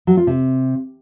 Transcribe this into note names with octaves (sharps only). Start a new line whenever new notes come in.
F#3
F4
C3